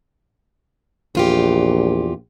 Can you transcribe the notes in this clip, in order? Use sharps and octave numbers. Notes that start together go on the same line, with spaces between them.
A#1 E2 F4 G4